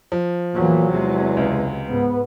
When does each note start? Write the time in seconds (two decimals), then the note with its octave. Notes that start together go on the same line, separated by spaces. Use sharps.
0.12 F3
0.55 E2 A#2 E3 F#3
0.90 E2 C3 G#3
1.37 C#2
1.90 G#2 B3